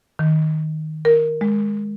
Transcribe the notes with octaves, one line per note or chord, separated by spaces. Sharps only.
D#3
A#4
G#3